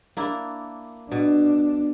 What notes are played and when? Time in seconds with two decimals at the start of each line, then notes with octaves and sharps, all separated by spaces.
0.17 A#3 D4 E4
1.11 B2 D4